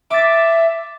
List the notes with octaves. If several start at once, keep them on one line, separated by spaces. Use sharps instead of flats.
E5 D6 A6